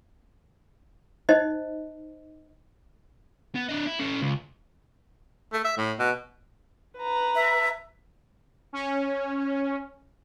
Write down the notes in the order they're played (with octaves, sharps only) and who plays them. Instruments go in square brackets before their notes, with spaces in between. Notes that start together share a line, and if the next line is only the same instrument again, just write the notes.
[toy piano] D#4 C5 D#5
[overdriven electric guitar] B3
D4 D#5
E4
C#4 A4
C#2
[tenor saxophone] A3
E5
A2
B2
[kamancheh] B4 A#5
[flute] E5
[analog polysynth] C#4